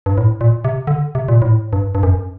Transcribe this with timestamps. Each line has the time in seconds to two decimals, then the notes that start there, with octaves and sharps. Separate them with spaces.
0.06 G2
0.18 A2
0.41 A#2
0.65 C3
0.87 D3
1.15 C3
1.28 A#2
1.42 A2
1.73 G2
1.95 G2
2.03 F#2